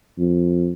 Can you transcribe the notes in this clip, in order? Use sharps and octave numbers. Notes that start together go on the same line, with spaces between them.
F2